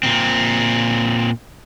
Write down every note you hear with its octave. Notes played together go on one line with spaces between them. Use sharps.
A#2 C4